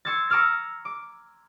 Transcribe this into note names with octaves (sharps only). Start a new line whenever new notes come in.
C6 C#6 E6 G#6 A6
A#5 C#6 D6 E6 F6 A6
D6